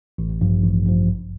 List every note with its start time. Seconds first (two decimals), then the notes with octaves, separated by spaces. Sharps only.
0.18 A1
0.41 G2 F3
0.63 A1
0.86 G2 F3
1.08 G1